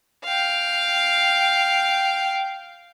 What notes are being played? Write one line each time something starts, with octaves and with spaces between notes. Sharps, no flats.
F5 G5